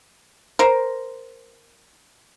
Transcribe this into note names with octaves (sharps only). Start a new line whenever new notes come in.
A#4 C5